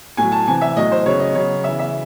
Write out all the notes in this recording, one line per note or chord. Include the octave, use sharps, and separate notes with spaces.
A2 F#3 G#5
A5
C3 E3 G#5
E5
A2 F#3 D#5
C5
C#3 F#3 C#5
D#5
C#3 F#3 C#5
C#3 E3 E5
E5